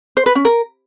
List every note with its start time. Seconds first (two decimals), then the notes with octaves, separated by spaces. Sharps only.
0.17 C5
0.26 B4
0.35 C#4
0.45 A#4